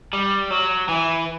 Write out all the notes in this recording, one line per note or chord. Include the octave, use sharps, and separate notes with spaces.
G3
F#3
E3